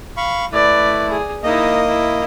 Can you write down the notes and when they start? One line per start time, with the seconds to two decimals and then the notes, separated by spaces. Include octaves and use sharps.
0.17 F5 B5 C#6
0.52 A3 E4 B4 D5
1.10 G#4
1.43 A#3 D#4 E4 D#5
1.86 E4